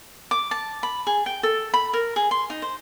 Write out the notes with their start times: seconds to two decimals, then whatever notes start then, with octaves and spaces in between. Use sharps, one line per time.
0.31 D6
0.51 A5
0.83 B5
1.07 G#4
1.26 G5
1.43 A4
1.74 B5
1.93 A#4
2.16 G#4
2.31 C6
2.50 D#4
2.62 C5